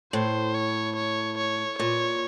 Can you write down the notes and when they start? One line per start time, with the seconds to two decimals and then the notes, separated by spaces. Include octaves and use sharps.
0.13 A2 C5
0.54 C#5
0.96 C#5
1.38 C#5
1.79 A#2 C#5